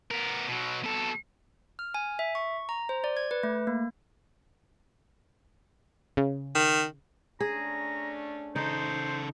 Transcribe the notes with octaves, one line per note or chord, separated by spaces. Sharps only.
B3 A#4
B2 F#3
B2 A4
F6
G#5
E5
C#6
A#5
C5
D5
G#6
B4
A3
A#3
C#3
D#3
A3 C#4 D4 G#4 A#5
C#3 D#4 A4 C5